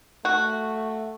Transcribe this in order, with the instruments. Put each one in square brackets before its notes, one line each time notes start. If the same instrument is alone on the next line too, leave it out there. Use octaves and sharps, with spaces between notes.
[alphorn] A3 [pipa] F#4